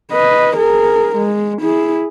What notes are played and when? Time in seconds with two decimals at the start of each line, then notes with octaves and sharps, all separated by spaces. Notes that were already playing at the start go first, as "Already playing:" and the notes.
0.12 B4 D#5
0.56 G#4 A#4
1.16 G#3
1.62 E4 G#4